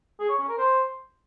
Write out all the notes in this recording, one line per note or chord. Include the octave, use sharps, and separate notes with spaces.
G#4
C#5
C#4
A#4
C5